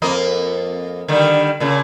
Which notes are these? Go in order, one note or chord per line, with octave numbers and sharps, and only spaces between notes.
F2 A#3 D#5
D3 D#3 G3
A#2 C#3